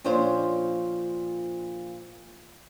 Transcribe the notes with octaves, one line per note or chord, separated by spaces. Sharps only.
A#2 F3 D4 F4 C5 C#5